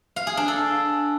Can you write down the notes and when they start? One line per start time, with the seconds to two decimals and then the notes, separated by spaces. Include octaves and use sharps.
0.16 F5
0.27 G#4
0.37 D4
0.48 A4